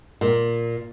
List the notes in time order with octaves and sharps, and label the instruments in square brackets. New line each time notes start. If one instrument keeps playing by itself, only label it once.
[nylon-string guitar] A#2